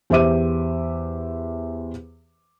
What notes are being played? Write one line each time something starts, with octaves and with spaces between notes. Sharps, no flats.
E2 G4 C5 E5 D6 D#7